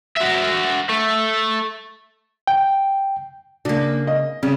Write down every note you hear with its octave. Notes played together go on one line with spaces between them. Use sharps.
F#4 E5
A3
G5
C#3 A#3 D4
D#5
C#3 G3